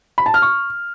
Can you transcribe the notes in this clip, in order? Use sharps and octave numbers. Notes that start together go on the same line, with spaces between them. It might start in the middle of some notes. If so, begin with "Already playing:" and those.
B5
A5
F6
C#6